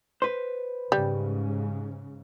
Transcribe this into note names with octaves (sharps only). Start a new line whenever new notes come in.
B4 C5
G#2 C#3 G3